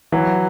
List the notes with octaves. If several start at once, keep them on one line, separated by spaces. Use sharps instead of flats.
E3 F#3